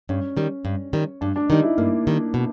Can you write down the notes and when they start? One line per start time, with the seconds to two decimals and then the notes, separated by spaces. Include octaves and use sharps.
0.09 G2 C#4
0.37 D#3 G3
0.65 G2
0.93 D#3 G3
1.21 G2 D4
1.36 D4
1.50 D#3 G3 D#4
1.63 E4
1.77 G2 A#3
2.07 D#3 G3
2.34 B2